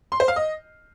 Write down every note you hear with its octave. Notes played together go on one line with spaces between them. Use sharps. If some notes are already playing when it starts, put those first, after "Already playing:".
C6
C5
F5
D#5